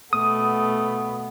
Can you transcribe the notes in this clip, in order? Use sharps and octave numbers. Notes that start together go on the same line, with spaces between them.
B2 A3 B3 D#6